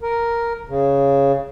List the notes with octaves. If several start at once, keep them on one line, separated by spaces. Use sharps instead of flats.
A#4
C#3